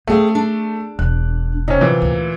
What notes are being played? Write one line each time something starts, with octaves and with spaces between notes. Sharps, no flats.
A3 A#3 C4 G#4 F5
D4
E1 F#6
C3 C#4 D#4
A#2 E3
D2